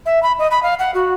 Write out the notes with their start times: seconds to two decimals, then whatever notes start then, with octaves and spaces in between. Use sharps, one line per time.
0.06 E5
0.23 B5
0.39 D#5
0.51 B5
0.63 F5
0.79 F#5
0.94 F#4